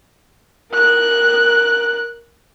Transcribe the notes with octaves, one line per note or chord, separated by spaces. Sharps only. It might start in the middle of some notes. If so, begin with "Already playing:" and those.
A#4 F#6